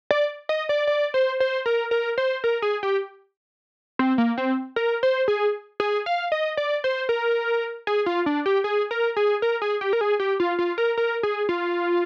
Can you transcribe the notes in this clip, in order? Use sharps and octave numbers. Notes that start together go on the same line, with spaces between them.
D5
D#5
D5
D5
C5
C5
A#4
A#4
C5
A#4
G#4
G4
C4
A#3
C4
A#4
C5
G#4
G#4
F5
D#5
D5
C5
A#4
G#4
F4
D4
G4
G#4
A#4
G#4
A#4
G#4
G4
A#4
G#4
G4
F4
F4
A#4
A#4
G#4
F4